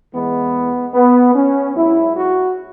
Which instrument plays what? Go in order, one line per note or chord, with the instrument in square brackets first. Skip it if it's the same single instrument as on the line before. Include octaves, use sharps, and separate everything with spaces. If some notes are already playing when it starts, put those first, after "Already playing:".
[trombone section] E2 E3 G#3 B3
B3
C#4
G#2 F#3 E4
F#4